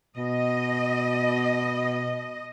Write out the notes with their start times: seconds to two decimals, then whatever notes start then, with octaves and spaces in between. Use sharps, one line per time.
0.17 B2 D#5